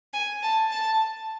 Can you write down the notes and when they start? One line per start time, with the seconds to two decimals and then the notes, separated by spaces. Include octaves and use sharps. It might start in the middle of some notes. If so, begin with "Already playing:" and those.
0.14 G#5
0.43 A5
0.71 A5